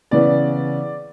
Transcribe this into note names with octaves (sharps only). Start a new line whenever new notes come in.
C#3 E3 B3 D5